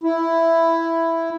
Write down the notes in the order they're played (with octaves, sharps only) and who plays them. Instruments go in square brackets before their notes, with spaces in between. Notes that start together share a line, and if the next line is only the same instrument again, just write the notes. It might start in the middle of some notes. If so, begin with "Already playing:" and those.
[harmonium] E4